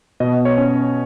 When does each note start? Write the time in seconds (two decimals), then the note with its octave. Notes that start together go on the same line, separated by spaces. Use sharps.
0.20 B2 D#5
0.45 C#5
0.58 C#4